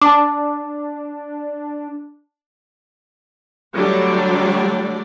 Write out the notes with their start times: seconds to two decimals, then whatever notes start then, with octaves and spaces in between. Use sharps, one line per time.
0.02 D4 A5 D6
3.75 D3 F#3 G3 A3 D4 D5